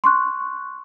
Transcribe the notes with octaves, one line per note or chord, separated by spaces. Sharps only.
C6 C#6 F#6